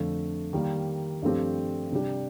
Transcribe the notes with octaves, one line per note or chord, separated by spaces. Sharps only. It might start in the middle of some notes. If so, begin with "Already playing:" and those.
Already playing: F2 D3 F3 A3
D#3 G3 A#3
G2 F3 A3 C4 G4
C3 G3 D4 G4